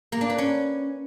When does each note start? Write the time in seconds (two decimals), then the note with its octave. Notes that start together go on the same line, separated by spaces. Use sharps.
0.12 A#3
0.21 D4
0.30 B4
0.38 C#4